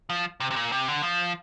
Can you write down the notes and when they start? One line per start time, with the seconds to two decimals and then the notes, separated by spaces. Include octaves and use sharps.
0.10 F3
0.40 C3
0.51 C3
0.56 A#2
0.72 C3
0.88 D3
1.03 F3